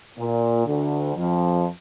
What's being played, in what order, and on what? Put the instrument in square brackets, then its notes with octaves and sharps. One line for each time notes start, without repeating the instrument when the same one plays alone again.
[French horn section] A#2
D2 D3
F2 F3